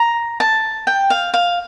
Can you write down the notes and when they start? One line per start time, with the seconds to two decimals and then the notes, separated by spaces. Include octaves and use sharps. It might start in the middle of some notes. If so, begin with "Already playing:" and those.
Already playing: A#5
0.40 A5
0.87 G5
1.10 F5
1.34 F5